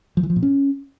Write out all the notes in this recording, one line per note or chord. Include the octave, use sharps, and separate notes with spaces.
F3
E3
F3
A#2
C#4